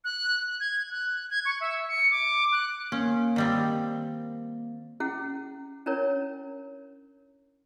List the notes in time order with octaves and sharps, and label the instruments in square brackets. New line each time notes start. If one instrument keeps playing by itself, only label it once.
[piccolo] F#6
G#6
F#6
G#6
C#6
E5
C#7
D6
F#6
[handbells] A#3 [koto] C#4
[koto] D#3 G3 C4
[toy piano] C#4 E4 G#4 F#5
C#4 D4 E4 A#4 C#5